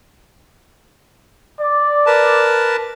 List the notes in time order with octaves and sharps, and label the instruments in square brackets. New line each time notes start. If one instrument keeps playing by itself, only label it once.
[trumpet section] D5
[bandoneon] A#4 B4 A5